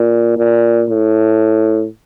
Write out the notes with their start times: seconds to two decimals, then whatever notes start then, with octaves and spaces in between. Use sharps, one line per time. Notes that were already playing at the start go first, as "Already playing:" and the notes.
Already playing: A#2
0.37 A#2
0.90 A2